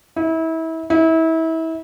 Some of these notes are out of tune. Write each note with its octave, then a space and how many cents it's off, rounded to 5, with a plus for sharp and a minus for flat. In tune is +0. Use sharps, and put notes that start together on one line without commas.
E4 -30
E4 -30